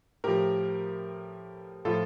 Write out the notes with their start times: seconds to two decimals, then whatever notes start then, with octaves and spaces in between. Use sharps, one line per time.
0.24 A2 F3 G4 A#4
1.85 A2 F3 F4 A4